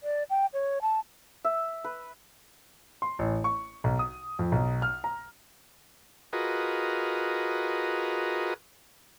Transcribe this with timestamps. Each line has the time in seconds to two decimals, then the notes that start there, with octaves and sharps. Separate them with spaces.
0.03 D5
0.30 G5
0.53 C#5
0.82 A5
1.45 E5
1.84 B4
3.02 C6
3.19 A1
3.44 C#6
3.84 B1
3.99 D#6
4.39 F2
4.52 B1
4.82 F6
5.04 A#5
6.33 F4 F#4 G#4 A#4 B4 D#5